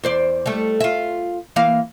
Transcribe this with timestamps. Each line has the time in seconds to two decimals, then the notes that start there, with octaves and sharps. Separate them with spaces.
0.03 E2 C5 D5
0.46 G3 A3
0.80 F4 E5
1.56 E3 A#3 F5